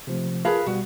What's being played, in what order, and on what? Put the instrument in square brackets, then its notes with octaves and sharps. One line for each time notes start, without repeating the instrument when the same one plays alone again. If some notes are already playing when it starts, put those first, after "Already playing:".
[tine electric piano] C3 F3 A3
[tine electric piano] F4 A#4 A5 [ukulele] G#4 B4 F5
[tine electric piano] B2 G3 [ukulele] F#4